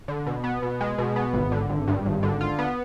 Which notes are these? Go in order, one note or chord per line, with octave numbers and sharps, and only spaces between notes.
D3
B2
B3
B2
G#3
B2
B3
G#1
D3
G#1
G2
G#1
D3
F4
B3